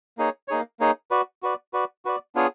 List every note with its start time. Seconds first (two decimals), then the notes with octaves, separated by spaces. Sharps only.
0.18 A#3 D#4 G#4 C#5
0.48 A#3 D#4 G#4 C#5
0.80 A#3 D#4 G#4 C#5
1.11 F#4 B4 D5
1.43 F#4 B4 D5
1.73 F#4 B4 D5
2.05 F#4 B4 D5
2.35 B3 D4 F4 G#4 C#5